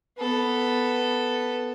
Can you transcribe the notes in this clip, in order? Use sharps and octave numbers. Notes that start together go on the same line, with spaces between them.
B3 A4